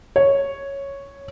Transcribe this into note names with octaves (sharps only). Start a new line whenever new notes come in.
C#5